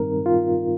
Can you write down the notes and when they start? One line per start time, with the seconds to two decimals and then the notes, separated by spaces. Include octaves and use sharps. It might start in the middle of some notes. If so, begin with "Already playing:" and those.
Already playing: G2 D#3 G3 C4 D#4 A#4
0.26 F4